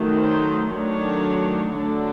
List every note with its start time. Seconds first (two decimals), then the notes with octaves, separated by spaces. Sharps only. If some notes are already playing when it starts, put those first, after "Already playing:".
Already playing: D#3 F#3 A3
0.18 C5
0.69 D#3 F#3 A3 D4 C#5
1.73 D3 F#3 A3 D4